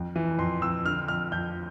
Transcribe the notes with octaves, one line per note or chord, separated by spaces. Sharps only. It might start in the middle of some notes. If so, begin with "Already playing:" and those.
Already playing: F2
E3
F2 C6
F2 E6
D3 F6
F2 F6
F2 G6